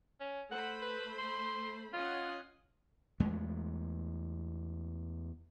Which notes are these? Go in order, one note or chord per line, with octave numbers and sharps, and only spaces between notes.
C#4
A3 C5 F#5 B5
B4
C6
C#4 F4 D#5 F#5
E2 G#3 A3